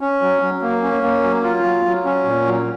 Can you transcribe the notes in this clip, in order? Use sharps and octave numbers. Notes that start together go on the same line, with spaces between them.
C#4
F#3
F#3
A#3
C#4
A#3
F#3
F4
F#3
F#3
C#4
A#2
F#3